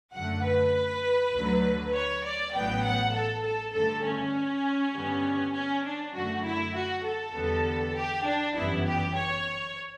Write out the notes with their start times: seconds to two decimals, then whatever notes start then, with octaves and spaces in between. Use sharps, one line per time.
0.14 F#2 D3 A3 F#5
0.44 B4
1.34 D2 D3 F#3 A3
1.94 C#5
2.24 D5
2.54 A1 A2 F#3 B3 G5
2.84 F#5
3.14 A4
3.44 A4
3.74 G2 D3 A3 A4
4.05 C#4
4.94 G2 D3 G3 B3
5.54 C#4
5.85 D4
6.14 F#2 D3 A3 F#4
6.45 E4
6.74 F#4
7.05 A4
7.34 E2 D3 G3 B3
7.95 G4
8.24 D4
8.55 G1 F#2 E3 G3 B3 E4
8.85 G4
9.15 C#5